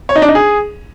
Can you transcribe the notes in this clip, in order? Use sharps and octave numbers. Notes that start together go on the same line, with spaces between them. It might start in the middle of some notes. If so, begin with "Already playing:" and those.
C#5
D#4
D4
D#4
G#4